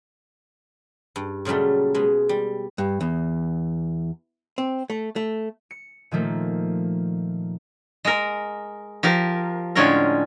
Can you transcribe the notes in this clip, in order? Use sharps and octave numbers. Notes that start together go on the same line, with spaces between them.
G2
A#2 C#3 F#3 G3 A3
B2 G#3
G3
G2
E2
C4
A3
A3
C#7
A#2 D#3 F3 A3 A#3
G#3 A#4
F3 G4 A#4
A2 D3 G#3 C#4 F4 A#4